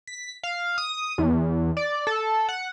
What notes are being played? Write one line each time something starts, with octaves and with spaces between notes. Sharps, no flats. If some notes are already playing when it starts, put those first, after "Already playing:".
B6
F5
D#6
E2
D5
A4
F#5